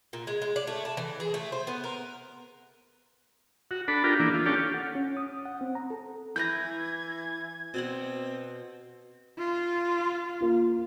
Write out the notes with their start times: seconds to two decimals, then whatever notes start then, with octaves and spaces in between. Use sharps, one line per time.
0.13 A#2
0.27 G#3
0.42 G#3
0.56 D5
0.67 A3
0.85 A5
0.97 E3
1.20 G#4
1.34 A3
1.52 C5
1.67 B3
1.84 A#4
3.71 F#4
3.88 D4 A4 B5
4.04 D4 F4 G4 A#4
4.20 E3 A#3 D4
4.34 F4
4.46 C#4 D4 G4 A4
4.74 F#5
4.95 C#4
5.17 D#6
5.45 F#5
5.61 C4
5.75 A#5
5.90 A4
6.36 E3 E4 B4 A#5 G6 G#6 A#6
7.74 B2 C4 D5 F#5
9.38 F4
10.41 A#3 F4